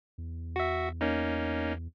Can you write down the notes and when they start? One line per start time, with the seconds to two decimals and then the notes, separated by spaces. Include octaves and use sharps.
0.18 E2
0.56 F#4 E5
1.01 A#3 C#4 D#4